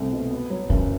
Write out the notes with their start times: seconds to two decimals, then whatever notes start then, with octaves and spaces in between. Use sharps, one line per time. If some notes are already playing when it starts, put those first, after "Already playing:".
Already playing: C2 A3 C4
0.13 B2
0.31 B3
0.50 F#3
0.70 F#1 E3